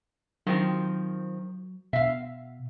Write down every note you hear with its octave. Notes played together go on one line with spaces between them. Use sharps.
D#3 F3 F#3 C4
B2 E5 F5